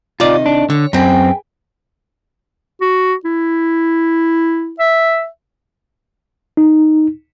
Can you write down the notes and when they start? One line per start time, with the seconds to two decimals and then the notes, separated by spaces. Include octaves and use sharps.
0.20 C3 D#3 F4 D5 D#5
0.46 D4
0.70 D3 C#5
0.93 F#2 C4 G#4 B4 G5
2.81 F#4
3.25 E4
4.79 E5
6.57 D#4